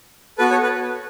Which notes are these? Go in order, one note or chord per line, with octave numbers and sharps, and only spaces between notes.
B3 F#4 A4 B4
A4 C#5
B4